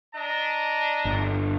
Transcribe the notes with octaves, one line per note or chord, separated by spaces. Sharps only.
D4 D#5 A#5
G1